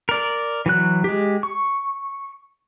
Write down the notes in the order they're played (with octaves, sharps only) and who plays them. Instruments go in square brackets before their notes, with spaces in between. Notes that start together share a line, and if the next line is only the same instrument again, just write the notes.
[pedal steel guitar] A#4 D5
E3 F#3 F#6
G#3 G4
C#6